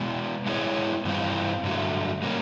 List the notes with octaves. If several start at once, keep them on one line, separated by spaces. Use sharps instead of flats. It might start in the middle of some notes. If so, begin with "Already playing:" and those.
Already playing: B2 G#3 B3
G#3 B3 E4 G#4 C#5
G2 E3 G3 C4 F4
G2 D3 F#3 A3
G3 A#3 C#4